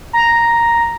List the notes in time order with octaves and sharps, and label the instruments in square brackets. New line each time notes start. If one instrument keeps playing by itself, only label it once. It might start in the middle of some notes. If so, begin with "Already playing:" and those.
[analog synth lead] A#5